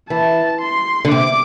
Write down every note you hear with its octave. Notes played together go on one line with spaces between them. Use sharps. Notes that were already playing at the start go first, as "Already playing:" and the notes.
E3 A5
C6
D3
C3 D6